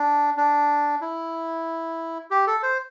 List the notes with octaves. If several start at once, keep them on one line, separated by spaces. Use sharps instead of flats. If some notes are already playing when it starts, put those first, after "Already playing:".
Already playing: D4
D4
E4
G4
A4
C5